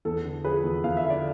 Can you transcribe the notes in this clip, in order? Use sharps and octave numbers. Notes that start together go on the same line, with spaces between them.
E2 A4
D3
F3 G#4 B4
E2
E2 F5
E5
D3
D5